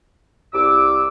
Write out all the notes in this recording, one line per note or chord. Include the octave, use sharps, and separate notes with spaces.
C2 D6 E6